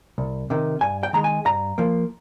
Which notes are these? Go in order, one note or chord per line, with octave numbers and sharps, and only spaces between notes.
C2
C3 D#3
G2 G#5
G5
D#3 G#3 A#5
G#5
G2 A#5
F3 A#3